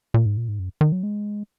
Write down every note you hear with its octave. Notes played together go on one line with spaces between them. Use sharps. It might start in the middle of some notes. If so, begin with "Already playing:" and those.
A#2
G#2
A#2
G#2
F#2
D#3
F#3
G#3